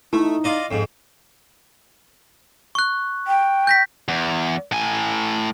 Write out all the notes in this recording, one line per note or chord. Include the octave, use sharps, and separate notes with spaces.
A3 D#4 E4
F4 D5 D#5
F2 G#2
C#6 F#6
G5
G6 A#6 B6
E2
A2 G#5